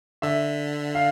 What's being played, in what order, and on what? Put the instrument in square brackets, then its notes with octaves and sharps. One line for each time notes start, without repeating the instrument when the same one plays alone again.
[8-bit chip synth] D3 [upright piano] E5
[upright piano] F5